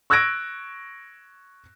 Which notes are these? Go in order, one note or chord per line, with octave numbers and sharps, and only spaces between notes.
C#6 E6 F#6 G#6 A#6 D7